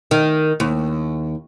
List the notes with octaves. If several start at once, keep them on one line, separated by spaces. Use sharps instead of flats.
D#3
D#2